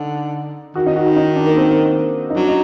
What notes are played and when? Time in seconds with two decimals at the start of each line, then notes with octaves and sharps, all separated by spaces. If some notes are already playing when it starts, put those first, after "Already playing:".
Already playing: D3 D#4
0.75 D#3 F#4
0.86 D#4
0.96 F#4
1.16 D#4
1.36 D4
1.46 A#3
1.56 C4
2.30 D#4
2.36 F#3 D4
2.48 D#4